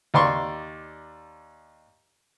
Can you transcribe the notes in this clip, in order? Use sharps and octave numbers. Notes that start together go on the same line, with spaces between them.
D#2 D5 C6 C#6